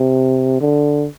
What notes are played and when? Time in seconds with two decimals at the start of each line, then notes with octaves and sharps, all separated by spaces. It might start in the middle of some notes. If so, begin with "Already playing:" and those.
Already playing: C3
0.61 D3